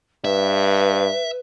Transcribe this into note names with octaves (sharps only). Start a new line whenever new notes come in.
G2 B4 E5